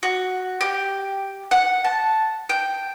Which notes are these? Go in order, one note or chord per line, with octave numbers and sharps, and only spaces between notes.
F#4
G4
F#5
A5
G5